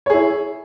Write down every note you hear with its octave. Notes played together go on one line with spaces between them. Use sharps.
E4 G#4 C#5